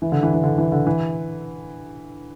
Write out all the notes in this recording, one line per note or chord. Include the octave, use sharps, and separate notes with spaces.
E3
D3
E3
E3
D3
E3
D3
E3